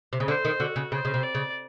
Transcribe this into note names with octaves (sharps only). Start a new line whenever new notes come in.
C3
C#3
D3 C5
D#3
D3 F#4
C#3
C#3 C5
C#3
C3
D5
C#3